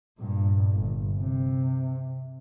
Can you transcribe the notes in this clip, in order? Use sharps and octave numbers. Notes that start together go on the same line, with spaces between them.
G2 A#2
G1
C3